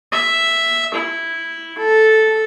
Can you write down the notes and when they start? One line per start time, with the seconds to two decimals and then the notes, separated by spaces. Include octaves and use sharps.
0.12 E5
0.94 E4
1.78 A4